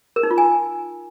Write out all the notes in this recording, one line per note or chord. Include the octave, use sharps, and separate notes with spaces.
A#4
D#4
F4
G#5